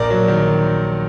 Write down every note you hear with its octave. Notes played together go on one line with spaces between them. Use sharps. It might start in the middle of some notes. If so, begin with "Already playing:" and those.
Already playing: A#1 A#4 D5
F#3
D#3